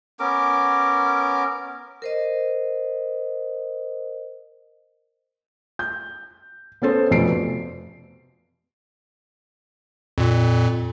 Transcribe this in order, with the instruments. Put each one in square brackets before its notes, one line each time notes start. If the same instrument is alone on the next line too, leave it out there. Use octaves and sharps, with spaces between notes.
[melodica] B3 C#4 A#4 D6
[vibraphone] A#4 C5 D#5
[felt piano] G6
B3 C#4 A4 C5
F1 F2 B2 C7 D7
[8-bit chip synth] F2 A#2